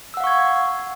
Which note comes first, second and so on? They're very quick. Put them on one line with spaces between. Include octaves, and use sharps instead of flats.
E6 F#5 F5 C#6 G#6